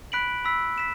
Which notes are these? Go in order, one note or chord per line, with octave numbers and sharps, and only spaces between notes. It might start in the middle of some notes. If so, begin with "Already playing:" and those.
B5 F#6 B6 D7 F#7
B5 E6 B6
B6 E7